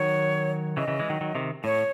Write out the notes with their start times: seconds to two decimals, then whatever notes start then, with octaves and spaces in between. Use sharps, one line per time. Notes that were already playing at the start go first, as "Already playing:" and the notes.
Already playing: D#3 F#3 C#5
0.77 C#3 E3 D#5
0.88 C#3 E3
0.99 E3 G#3
1.10 D#3 F#3
1.21 D#3 F#3
1.35 C3 D#3
1.64 A2 C#5